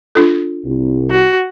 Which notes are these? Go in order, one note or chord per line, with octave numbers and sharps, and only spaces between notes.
D4 F4 A4
C2
F#4